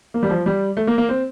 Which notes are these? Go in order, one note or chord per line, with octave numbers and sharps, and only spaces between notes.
A#3
G3
F3
G3
A3
A#3
A#3
C4